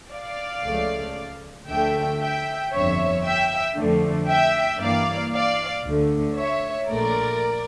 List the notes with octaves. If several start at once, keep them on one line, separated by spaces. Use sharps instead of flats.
D5 F5
C#2 C#3 F3 A3
D2 D3 F3 A3 E5 G5
E5 G5
G1 F2 D3 C#5 E5
E5 G5
F2 D3 F3 A3
E5 G5
G2 E3 A#3 D5 F5
D5 F5
D2 D3 A3
C#5 E5
A#1 A#2 A3 A#4 D5